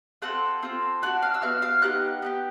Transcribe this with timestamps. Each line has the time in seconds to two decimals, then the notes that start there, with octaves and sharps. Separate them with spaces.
0.22 C4 F4 A4 F#5 F#6
0.62 C4 F4 A4
1.02 B3 D4 F#4 F#5 F#6
1.22 F5 F6
1.34 E6
1.42 B3 D4 F#4 F5 F6
1.62 F5 F6
1.82 B3 D#4 G4 F#5 F#6
2.22 B3 D#4 G4